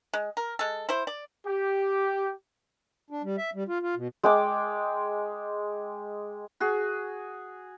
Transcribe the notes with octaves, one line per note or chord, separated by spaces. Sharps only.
G#3
A#4
G#3 A4
E4 C5
D5
G4
D4
G3
E5
G3
F4
F4
B2
G#3 G5 D6
F#4 G#4